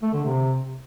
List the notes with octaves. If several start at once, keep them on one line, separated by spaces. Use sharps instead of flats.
A3
D3
C3